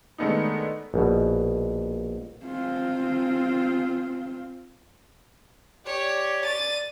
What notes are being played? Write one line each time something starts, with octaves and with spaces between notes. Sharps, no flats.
D#3 G#3 A3 B3 D4 D#4
A#1 B2
C4 F4
G4 C#5 D5
A6 D#7